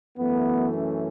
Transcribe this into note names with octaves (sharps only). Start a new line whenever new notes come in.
F#2 E3 A3 B3
C#4